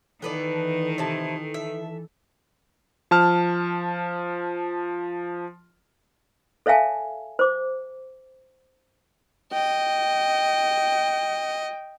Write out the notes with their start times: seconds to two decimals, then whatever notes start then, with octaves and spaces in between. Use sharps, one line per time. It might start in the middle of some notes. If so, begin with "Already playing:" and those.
0.22 D#3 E3 B3 A4 B4 D5
0.98 C3 E4 A5
1.54 E5
3.11 F3 A5 F6
6.66 A4 C#5 E5 F5 G#5 A5
7.39 C5 D6
9.53 D#5 G5